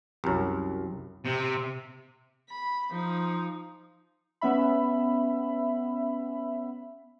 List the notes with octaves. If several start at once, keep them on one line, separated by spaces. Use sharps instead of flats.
C2 F#2
C3
B5
F3 D#4
B3 C#4 E5 B5